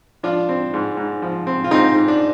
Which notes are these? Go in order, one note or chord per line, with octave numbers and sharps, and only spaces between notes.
F3 D4 F4
C4
G#2
G#2
F3
C4
F4
G#2 C4 D#4
G#2
D4